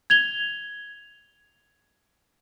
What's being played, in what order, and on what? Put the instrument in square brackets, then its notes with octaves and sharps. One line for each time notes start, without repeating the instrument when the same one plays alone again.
[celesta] G#6 F7 G7